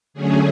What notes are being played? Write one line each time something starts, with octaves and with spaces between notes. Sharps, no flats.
D3 F#3 A3 C#4 G#4